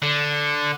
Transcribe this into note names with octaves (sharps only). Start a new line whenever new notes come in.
D3